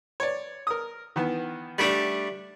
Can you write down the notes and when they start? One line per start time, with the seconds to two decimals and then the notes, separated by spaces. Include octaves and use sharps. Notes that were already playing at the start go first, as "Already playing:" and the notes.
0.20 C#5 D5
0.67 A#4 D#6
1.16 D#3 E3 B3
1.78 G3 A3 D4